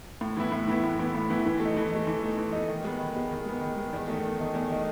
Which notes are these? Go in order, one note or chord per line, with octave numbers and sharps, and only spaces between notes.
A2
E3 B3 E4
A2
E3 B3 E4
A2
E3 B3 E4
A2
E3 B3 E4
E3
A3
D#4
E3
A3 D#4
E3
A3 D#4
E3
A3 D#4
D#3
G#3 B3
D#3
G#3 B3
D#3
G#3 B3
D#3
G#3 B3
E2
D#3 A3 D#4
E2
D#3 A3 D#4
E2
D#3 A3 D#4